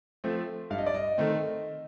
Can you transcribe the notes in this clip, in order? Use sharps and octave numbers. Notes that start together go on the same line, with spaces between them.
F3 A3 C4
G2 F5
D#5
D5
D#5
D#3 A3 C4